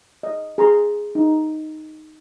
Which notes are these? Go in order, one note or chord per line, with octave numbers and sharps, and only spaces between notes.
D#5
G#4 A#5 C6
D#4